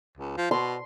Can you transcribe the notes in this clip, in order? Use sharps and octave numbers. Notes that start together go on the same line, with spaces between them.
C#2
F3
B2 C6